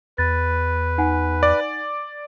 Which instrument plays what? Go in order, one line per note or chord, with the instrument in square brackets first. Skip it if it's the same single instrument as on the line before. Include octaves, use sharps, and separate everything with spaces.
[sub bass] E2 [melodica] B4 [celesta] A6
[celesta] D#4 F#5 G#5
[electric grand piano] D5